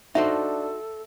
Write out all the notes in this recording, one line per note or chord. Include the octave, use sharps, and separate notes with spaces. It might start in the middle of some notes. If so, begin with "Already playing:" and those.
D4 D#4 F#4 A4 C5 E5